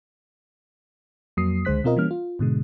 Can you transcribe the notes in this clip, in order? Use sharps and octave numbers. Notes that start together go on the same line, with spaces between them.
F2 F#3 A#3 D#6 C7
C#2 D3 G#3 C5 F#6 B6
B2 C4 F4 A#4 D#5
E3 G3 A#3 C#4 F6
F4
G#2 B2 D3 G#3